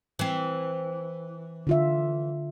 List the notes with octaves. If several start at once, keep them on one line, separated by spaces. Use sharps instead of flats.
E3 C4
D3 F4 E5